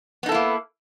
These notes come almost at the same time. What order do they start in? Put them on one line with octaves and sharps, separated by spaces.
B3 D#4 A4 E4 A#3